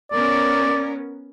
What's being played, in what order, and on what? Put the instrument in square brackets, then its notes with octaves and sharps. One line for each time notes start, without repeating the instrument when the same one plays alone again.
[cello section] B3 C#4 A#4 [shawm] D5